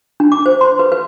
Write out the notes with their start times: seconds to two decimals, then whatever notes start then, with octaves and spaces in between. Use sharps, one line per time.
0.20 D4
0.32 D6
0.46 C5
0.61 C6
0.79 B4
0.92 B4